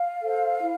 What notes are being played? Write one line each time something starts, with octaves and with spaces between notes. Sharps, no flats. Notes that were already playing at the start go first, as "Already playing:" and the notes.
Already playing: F5
A4 C5
E4